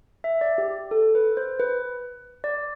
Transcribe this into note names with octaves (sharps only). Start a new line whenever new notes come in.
E5
D5
G4
A4
B4
C5
B4
D5